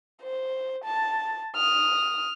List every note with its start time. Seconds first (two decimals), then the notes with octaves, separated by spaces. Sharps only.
0.23 C5
0.85 A5
1.56 D#6 F6